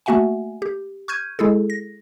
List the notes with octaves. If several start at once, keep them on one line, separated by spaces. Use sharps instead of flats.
A3 A#3 F#4 E5 F#5 G#5
G4
C#6 F6 G6 G#6 D#7
G#3 E4 G#4 A4
A#6